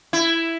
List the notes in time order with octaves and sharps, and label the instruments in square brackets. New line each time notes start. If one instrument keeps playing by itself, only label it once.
[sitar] E4